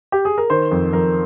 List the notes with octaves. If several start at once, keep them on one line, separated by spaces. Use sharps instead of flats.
G4
G#4
A#4
D#3 C5
F2
F2 A#4